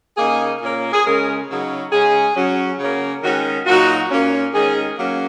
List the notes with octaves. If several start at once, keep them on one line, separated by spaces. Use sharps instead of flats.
C#3 A#3 D#4 G#4
A#2 A#3 C#4
G#4
C#3 G#3 C#4 A#4
C#3 F#3 D#4
C#3 G#3 C#4 G#4
F#3 C#4
C#3 A#3 C#4
D#3 G#3 C#4 F#4
A#2 F#3 D#4 F#4
A#2 A#3 C#4
D#3 G#3 C#4 G#4
F#3 A#3 C#4